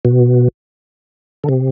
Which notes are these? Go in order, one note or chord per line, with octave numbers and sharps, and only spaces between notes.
B2
D3
C3